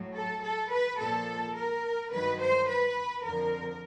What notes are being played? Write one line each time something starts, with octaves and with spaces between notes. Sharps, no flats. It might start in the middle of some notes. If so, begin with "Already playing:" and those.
Already playing: A2 F#3
A4
A4
B4
A#2 F3 A4
A#4
G2 D#3 F#3 B4
C5
B4
F2 D3 F3 A#4